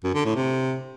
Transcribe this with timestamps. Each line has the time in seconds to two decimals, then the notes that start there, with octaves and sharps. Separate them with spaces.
0.04 F#2
0.15 D3
0.25 A2
0.36 C3